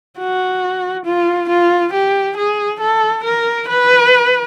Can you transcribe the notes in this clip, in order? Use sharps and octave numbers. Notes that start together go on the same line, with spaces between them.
F#4
F4
F4
G4
G#4
A4
A#4
B4